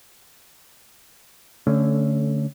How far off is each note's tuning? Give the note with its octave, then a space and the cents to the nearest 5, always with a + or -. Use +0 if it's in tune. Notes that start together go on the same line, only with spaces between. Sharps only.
D3 -15 A3 +0 C#4 +0